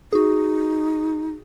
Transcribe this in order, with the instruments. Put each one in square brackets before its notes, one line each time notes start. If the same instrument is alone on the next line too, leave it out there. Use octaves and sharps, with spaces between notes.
[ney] D#4 [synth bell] F#4 G#4